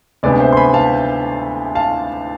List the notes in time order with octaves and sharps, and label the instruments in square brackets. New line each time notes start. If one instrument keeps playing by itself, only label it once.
[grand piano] D2 C3 G#3 B3 D4 D5
C5 E5
C6
G#5 B5
F5 A5
F5 A5